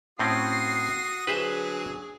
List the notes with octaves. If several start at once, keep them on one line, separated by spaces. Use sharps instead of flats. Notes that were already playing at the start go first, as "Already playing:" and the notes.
A2 C4 C#4 F#4 D#6 C7
D3 F#3 G#4 B4 C5 E5